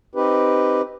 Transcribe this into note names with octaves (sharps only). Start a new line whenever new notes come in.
C4 D#4 G4 B4